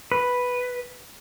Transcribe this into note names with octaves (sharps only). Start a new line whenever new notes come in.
B4